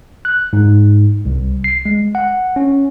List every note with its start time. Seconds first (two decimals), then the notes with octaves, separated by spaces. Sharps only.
0.25 F#6
0.53 G#2
1.25 C2
1.64 C7
1.86 G#3
2.15 F#5
2.56 C#4